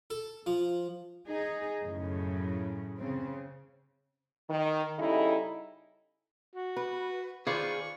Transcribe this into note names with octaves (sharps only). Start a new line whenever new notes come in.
A4
F3
D#4 G#4
F#2 A2 C#3
C#3 C4
D#3
C#3 G3 D#4 E4 A4
F#4
B4
D#3 F4 G#4 B4 C5 D5 C#6